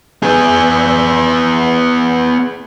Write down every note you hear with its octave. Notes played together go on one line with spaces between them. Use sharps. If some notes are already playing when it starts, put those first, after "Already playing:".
B3 G#4